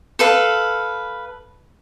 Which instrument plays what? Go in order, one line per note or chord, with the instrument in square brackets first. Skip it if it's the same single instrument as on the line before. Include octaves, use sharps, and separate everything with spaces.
[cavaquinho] A4 B4 F5